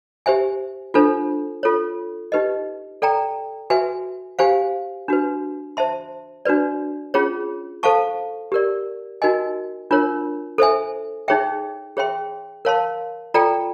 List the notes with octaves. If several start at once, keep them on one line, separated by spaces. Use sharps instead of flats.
G4 C5 E5 G#5
D4 F4 A4 C5
F4 A4 C#5
D#4 G4 B4 D#5
A4 D5 G5 A#5
F#4 B4 E5 G#5
G4 C5 F5 G#5
D4 F#4 B4
C5 E5 A5 C6
D4 F#4 B4 D5
C#4 F4 G#4 C#5
A4 C5 F5 A5 C#6
G4 A#4 D5
D#4 F#4 A#4 D#5 G#5
D4 F4 A#4 C#5
A4 C5 E5 G#5
D#4 G#4 C#5 E5 G5
G#4 C#5 E5 G5 C6
A#4 C#5 F5 A5 C6
F4 A4 D5 G5 A#5